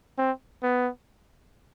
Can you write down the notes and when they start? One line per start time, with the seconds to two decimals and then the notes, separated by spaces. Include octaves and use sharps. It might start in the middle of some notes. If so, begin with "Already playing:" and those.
0.18 C4
0.63 B3